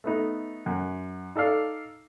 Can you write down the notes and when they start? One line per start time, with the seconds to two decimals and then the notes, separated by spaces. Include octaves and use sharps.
0.04 A3 B3 D#4
0.66 F#2
1.35 D#4 A4 D5 F5